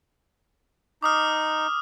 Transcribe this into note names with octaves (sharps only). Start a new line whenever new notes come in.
D#4 D6 D#6 F6